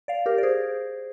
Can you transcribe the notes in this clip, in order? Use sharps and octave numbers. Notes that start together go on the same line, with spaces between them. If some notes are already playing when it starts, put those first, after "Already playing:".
D5 F5
G4 A#4
D5
G#4 C5